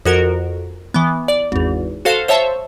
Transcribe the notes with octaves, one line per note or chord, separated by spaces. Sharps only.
F2 F#4 A#4
E3 B3
D5
G#1 E2
F#4 A4 C5 F5
C5 C#5 E5 A5